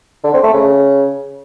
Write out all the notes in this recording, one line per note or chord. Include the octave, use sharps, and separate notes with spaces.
D3
C4
A3
C#3